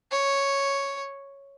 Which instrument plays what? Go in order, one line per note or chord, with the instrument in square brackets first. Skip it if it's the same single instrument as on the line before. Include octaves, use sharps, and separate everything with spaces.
[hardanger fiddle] C#5